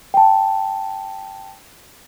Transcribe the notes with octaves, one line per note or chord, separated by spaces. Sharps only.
G5 A5